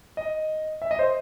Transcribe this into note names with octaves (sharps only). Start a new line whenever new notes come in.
D#5
E5
D#5
C5